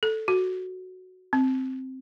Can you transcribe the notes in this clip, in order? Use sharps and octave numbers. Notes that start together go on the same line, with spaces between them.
A4
F#4
C4